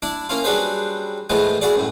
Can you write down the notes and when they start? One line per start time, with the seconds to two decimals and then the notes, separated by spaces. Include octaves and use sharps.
0.02 D4 E4 D5
0.29 A#3 C#4 E4 F4
0.44 F#3 G3 D4 G#4 B4 C5
1.30 A2 E3 F3 G#3 B3
1.61 E4 F#4 G#4 D5
1.75 F#2 A2